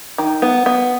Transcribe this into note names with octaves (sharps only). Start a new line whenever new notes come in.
D#3
B3
B3